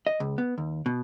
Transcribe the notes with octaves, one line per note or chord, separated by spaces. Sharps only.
D#5
C#2
B3
D#2
B2